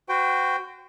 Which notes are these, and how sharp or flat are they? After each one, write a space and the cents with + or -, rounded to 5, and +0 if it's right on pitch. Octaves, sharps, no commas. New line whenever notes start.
F#4 +0 C5 -40 G5 +0